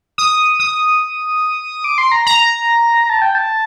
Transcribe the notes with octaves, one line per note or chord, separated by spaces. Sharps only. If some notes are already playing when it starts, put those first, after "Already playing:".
D#6
D#6
D6
C6
A#5
A#5
A5
G5
A5